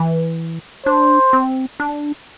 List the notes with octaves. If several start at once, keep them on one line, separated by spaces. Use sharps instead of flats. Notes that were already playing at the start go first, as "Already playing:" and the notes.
Already playing: E3
D4 C5
C4
D4